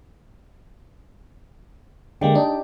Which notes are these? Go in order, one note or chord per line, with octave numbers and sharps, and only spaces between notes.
D3 G#3 A#3 G4 D5
D4 D#4